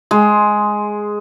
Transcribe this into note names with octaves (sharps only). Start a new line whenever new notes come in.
G#3